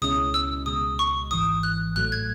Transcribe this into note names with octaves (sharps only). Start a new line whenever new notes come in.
C#2 B2 G#3 C#4 E4 D#6
E6
C#2 B2 G#3 D#6
C#6
G#1 G#2 E3 D#6
F#6
A1 A2 F#3 A3 F#6
G#6